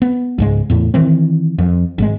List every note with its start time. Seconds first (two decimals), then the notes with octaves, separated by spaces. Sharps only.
0.02 B3
0.38 C#2 G#2 G#3
0.70 E2 A2
0.94 D#3 E3 C4
1.58 F2
1.98 G#1 C#3 G#3